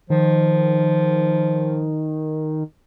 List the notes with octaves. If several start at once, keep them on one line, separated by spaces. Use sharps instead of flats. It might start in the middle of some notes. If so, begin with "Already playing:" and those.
D#3 F3